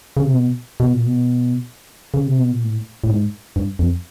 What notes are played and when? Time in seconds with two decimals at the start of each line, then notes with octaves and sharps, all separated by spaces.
0.17 C#3
0.25 C3
0.33 B2
0.80 B2
0.93 A#2
1.06 B2
2.14 C#3
2.27 C3
2.39 B2
2.52 A#2
2.64 A2
3.04 A2
3.10 G#2
3.56 G2
3.79 F2